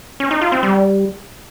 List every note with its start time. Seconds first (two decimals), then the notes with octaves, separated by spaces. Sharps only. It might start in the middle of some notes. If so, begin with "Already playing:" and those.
0.20 C#4
0.31 D#4
0.41 F4
0.52 C4
0.63 G3